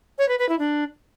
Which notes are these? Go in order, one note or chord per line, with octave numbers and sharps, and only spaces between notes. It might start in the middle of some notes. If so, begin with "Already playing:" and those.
C#5
B4
B4
E4
D4